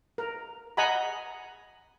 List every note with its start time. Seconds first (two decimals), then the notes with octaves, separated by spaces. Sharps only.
0.18 A#4
0.77 D#5 F#5 G#5 A#5 B5